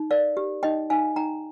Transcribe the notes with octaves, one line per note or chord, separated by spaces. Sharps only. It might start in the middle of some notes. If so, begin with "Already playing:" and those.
Already playing: D#4
A#4 D5 F5
G4
D#4 D#5 G5
D#4 F5 G#5
D#4 G5 A#5